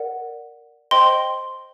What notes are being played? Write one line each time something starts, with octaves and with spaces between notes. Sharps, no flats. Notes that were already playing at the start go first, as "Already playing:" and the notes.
Already playing: A#4 D5 F#5
C5 D#5 G5 C6